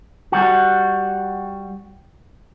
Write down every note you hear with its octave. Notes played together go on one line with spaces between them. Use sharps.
G3 F#4